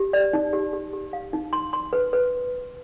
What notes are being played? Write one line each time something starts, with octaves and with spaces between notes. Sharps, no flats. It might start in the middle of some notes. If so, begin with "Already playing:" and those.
Already playing: G4
D5
D#4
G4
G4
G4
F5
D#4
C6
C6
B4
B4